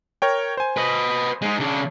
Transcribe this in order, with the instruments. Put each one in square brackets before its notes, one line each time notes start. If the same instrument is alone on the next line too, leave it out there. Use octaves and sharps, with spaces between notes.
[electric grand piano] A#4 C#5 G5
C5 G#5
[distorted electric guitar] B4 D#5
G#3 D#4
C#3 D4